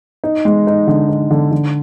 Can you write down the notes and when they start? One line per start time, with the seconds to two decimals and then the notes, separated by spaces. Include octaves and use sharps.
0.24 D#4
0.45 G#3
0.67 D#4
0.87 D3
1.09 D#4
1.31 D3
1.52 D3